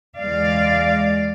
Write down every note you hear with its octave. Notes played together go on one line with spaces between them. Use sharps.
E2 G#3 D5 F5